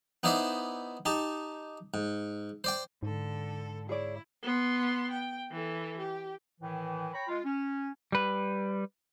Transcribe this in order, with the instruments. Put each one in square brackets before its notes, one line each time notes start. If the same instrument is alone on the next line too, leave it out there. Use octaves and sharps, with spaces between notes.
[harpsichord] B3 D#4 E4 C5 D5 E5
D#4 G4 A5
G#2
C5 D5 G5
[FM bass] G#2 [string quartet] D3 A4
[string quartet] E4 [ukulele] G#4 C#5 D5
[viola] B3 C6
G5
E3 A4
G4
[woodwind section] A2 D#3 E3
C#5 G5 A#5 B5
G#3 F4
C#4
[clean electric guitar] G3 B4